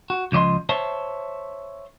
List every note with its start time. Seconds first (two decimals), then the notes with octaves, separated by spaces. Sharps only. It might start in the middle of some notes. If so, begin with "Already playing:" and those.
0.10 F#4
0.32 C#2 F3 D5 D#5 C6
0.69 C5 C#5 E5 A5